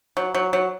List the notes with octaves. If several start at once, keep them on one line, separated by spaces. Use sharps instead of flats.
F#3
F#3
F#3